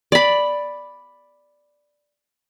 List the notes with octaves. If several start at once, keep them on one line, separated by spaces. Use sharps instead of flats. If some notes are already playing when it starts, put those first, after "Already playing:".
D5 B5